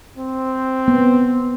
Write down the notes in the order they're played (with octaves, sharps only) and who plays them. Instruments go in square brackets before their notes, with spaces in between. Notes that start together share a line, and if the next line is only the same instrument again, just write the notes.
[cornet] C4
[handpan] B3